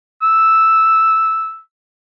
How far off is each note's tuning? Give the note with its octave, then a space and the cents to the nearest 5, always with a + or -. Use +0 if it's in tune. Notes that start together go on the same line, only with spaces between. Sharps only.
E6 -5